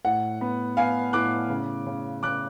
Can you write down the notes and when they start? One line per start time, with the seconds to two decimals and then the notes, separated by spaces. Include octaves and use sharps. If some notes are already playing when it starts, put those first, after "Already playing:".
0.05 A2 F#5
0.41 B3
0.77 B3 F5 G#5
1.13 A2 D6 F#6
1.50 C#3
1.87 C#3
2.23 C#3 D6 F#6